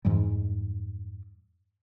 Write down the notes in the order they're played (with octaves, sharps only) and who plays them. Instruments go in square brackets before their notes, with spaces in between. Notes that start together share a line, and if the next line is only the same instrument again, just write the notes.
[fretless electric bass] F2 G#2 E3 G3